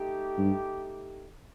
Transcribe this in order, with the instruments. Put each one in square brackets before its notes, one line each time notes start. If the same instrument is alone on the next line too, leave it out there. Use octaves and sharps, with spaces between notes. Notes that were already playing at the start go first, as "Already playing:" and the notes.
Already playing: [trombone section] A3 D#4 G4
[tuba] G2